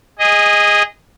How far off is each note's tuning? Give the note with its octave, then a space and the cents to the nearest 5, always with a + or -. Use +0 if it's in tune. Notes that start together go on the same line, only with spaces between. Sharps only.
G#4 -20 D#5 +0